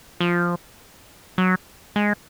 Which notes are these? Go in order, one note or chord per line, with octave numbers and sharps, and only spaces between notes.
F3
F#3
G#3